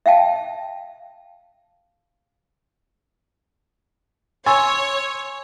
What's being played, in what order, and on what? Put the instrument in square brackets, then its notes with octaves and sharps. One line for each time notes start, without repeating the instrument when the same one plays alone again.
[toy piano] E5 F5 G5 A5
[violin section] C#5 [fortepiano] G#5 [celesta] C6 C#6 E6